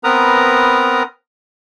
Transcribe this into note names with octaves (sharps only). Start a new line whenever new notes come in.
B3 C4 A#4 B4 A#5 D#6